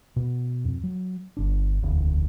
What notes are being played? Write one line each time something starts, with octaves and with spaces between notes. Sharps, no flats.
B2
F2
F#3
G1 D4
E1 D2